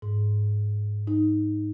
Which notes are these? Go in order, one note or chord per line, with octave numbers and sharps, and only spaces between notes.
G#2
D#4